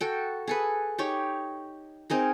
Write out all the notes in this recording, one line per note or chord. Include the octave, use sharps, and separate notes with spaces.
F#4 A4 G5
G#4 A4 B4
D#4 G4 C#5
C4 D#4 G#4 A#4